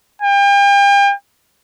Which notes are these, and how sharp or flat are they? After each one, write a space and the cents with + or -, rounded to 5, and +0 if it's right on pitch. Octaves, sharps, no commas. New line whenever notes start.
G5 +40